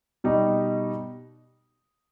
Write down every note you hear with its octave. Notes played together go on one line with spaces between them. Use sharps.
B2 G3 D#4